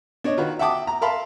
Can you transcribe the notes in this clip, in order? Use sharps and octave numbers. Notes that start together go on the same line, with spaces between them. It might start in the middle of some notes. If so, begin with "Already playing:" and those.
D4 C#5 D#5
D#3 F4 F#4 B4
E5 F#5 G5 A5 D6 D#6
A#5
A#4 E5 F5 A5 B5 C6